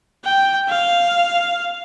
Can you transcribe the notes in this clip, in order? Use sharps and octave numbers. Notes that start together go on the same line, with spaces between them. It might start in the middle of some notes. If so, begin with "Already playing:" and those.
G5
F5